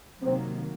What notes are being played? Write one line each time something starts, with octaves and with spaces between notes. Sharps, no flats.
C3 D#3 F#3 A#3 C4